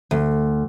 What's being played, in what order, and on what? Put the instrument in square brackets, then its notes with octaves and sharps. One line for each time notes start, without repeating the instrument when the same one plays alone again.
[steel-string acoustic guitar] D2